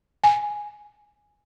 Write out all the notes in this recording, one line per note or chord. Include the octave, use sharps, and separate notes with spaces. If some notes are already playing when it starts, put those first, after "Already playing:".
G#5